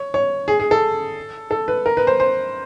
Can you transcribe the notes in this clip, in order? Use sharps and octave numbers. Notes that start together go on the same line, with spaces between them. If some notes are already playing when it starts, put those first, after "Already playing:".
Already playing: C#5
C#5
G#4
G#4
A4
A4
B4
A#4
B4
C5
C5